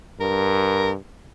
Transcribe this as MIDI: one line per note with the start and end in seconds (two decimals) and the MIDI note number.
0.20 0.97 43
0.20 0.91 70